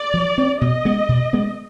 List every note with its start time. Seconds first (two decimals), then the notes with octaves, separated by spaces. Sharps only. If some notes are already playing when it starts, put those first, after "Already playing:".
Already playing: D5
0.14 F3
0.38 C4
0.61 B2 D#5
0.85 G#3 B3
1.09 B2
1.33 G#3 B3